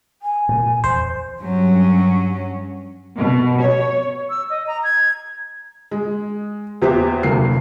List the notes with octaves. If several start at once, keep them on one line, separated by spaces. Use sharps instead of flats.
G#5
A#2 A3 A#3
E2 C5
G2 F#3 C#4
B2
C#5
E6
D#5
A#5
G#6
G#3
E2 G4 B4 C5 E5 D6
F1 D2 F#3 A#3 E4 C7